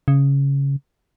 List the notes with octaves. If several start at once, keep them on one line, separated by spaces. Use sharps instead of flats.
C#3